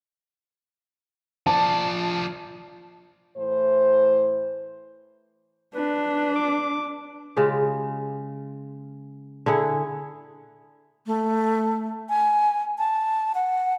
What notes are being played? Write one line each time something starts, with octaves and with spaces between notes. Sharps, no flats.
F3 D5 A5
A2 E3 C5
D4 B4
D6
C#3 G#3 F4 G4
D3 E4 G#4 F#5
A3
G#5
A5
F#5